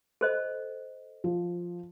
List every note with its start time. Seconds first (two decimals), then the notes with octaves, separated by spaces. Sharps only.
0.21 A4 C5 D#5
1.24 F3